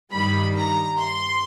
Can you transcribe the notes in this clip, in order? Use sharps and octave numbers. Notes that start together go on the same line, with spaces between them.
G2 D#3 G3 B5
A#5
C6